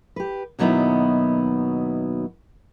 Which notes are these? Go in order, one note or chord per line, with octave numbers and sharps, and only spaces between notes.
G4 B4
D#2 B2 F#3 B3 D#4 E4